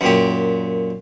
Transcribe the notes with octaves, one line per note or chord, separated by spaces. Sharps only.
F#2 A#2 G4